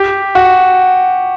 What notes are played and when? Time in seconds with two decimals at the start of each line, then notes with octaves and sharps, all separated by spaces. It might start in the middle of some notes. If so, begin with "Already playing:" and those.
Already playing: G4
0.35 F#4